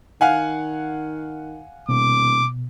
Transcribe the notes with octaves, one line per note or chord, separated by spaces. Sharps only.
D#3 F5 F#5 G#5
D#1 B2 D6